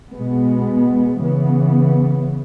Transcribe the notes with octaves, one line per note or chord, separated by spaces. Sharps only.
B2 G#3 B3
C#3 E3 B3